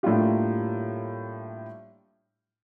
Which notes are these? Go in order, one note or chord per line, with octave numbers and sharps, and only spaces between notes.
A2 G3 A#3 D4 F4 G4